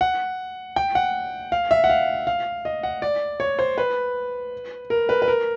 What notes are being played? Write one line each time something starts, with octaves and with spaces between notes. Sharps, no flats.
F#5
G5
F#5
F5
E5
F#5
F5
F5
D#5
F#5
D5
C#5
C5
B4
A#4
B4
B4
A#4